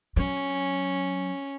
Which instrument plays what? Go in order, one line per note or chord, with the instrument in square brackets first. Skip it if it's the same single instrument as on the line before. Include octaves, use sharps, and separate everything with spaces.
[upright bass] F#3 [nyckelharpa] C#4